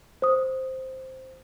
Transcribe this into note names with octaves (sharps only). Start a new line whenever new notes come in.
C5 D#6